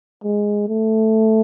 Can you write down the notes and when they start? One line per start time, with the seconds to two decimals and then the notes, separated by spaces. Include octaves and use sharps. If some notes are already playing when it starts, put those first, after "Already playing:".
0.24 G#3
0.68 A3